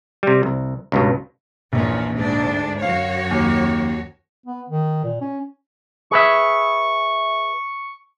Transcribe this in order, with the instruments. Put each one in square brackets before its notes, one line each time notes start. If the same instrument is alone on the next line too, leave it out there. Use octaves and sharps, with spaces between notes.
[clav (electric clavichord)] C3 G3
C2
C#2 G2 B2
[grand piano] A#1 [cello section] E2 A#2 C#4
[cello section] D2 G#2 D4
[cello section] F#2 F#4 C#5 [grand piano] F5
[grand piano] D#2
[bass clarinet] B3
D#3
A#2
C#4
[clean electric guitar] G#4 B4 E5 [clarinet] C#6